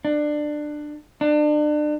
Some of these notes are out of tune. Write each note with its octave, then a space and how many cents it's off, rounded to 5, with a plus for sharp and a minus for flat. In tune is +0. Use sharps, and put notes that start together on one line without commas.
D4 +20
D4 +35